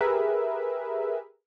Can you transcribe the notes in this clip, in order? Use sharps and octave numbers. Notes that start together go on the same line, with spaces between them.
G4 G#4 A#4 B4 E5